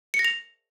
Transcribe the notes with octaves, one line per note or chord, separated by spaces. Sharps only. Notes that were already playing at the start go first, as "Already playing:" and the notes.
C#7
A#6
F7